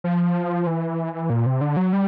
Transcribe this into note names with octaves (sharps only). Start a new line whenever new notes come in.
F3
E3
A#2
C3
D3
F#3
G3